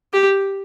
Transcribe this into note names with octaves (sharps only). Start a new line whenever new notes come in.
G4